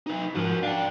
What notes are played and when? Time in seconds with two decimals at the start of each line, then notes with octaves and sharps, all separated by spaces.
0.07 D#4 B4
0.35 G#2 F3 F#4 A#4
0.63 D4 F5 G5